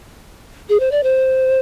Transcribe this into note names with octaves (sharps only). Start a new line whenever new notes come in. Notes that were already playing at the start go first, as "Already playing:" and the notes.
G#4
C5
D5
C5